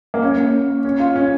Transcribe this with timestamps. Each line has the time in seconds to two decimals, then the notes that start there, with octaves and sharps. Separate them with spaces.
0.14 A#3
0.22 C#4
0.85 C#4
0.99 F4
1.16 C#4